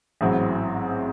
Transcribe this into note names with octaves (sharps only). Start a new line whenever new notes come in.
A1 G#2 F#3 C4 E4